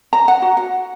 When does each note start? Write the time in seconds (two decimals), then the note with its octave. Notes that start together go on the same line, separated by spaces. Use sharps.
0.13 A#5
0.28 F#5
0.42 F#4
0.57 F#5